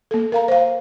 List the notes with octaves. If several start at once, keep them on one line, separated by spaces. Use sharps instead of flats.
A#3 A4
A#4 F5 A#5
C5 F5